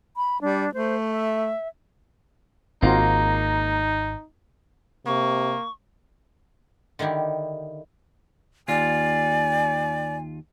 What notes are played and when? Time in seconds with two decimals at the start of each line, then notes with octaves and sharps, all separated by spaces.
0.16 B5
0.42 G3 D4
0.74 A3 C5
1.10 E5
2.82 G#1 A#3 C4 D#4 F4 F#4
5.06 C3 A#3 C#6
6.99 D3 D#3 D#4 E4 G4
8.68 D#2 F4 D5 G#5